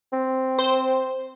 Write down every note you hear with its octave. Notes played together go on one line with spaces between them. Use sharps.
C4
C5